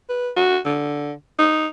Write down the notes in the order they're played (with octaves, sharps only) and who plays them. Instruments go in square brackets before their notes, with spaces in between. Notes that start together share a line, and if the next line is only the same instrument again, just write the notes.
[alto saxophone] B4
F#4
D3
D#4